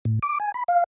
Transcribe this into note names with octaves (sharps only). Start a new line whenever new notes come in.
A2
D6
G#5
B5
F5